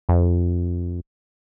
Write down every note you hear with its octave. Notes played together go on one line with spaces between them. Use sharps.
F2